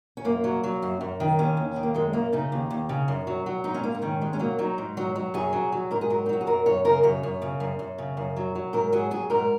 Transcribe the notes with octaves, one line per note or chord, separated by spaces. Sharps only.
C#4
F#2 A#3
F#3
F#3
F#2
F#2
D#3
D#2 C#4
D#2
D#3
A#3
F#2 G#3
F#2 A#3
C#3 D#4
D#2
D#2
C#3
F#2
F#3
F#3
G#2 D#4
C#4
G#2 A#3
D#4
D#3 C#4
G#2 G#3
C#4
F#3 A#3
F#3 D#4
G#2
F#3
F#3
F#2 G#4
F#3
F#3
G#2 A#4
G#4
F#3 A#4
D#4
F#3 F#4
G#4
F#2 A#4
F#2 C#5
C#3 A#4
F#2 C#5
F#2
C#3
F#2
F#2
C#3
F#2
F#3
F#3
G#2 A#4
F#3 G#4
F#3 G#4
G#2 A#4